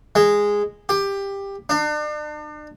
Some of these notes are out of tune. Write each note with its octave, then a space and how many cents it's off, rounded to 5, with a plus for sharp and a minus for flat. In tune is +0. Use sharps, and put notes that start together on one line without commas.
G#3 -10
G4 +15
D4 +40